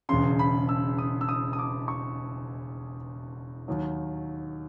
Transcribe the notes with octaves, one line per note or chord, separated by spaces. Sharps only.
E1 E2 C#3 C6
B5
E6
D#6
E6
D#6
D#6
D6
C#6
D#2 D#3 F#3